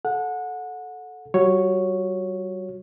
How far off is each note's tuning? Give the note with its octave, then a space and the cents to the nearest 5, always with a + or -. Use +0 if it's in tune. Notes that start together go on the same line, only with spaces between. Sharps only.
A4 -10 F#5 -25
G3 -35 F#4 -15 C#5 +0